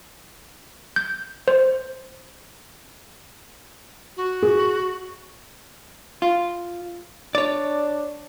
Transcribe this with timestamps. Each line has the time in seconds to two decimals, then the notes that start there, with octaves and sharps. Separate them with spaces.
0.96 G6
1.48 C5
4.16 F#4
4.43 G#4
6.22 F4
7.35 D4 C#5 D5